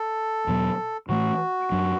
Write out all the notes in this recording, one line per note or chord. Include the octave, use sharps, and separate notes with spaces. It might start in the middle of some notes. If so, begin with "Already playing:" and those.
Already playing: A4
E2 B2 F#3 B3
A2 E3 A3 F#4
F#2 F#3 D4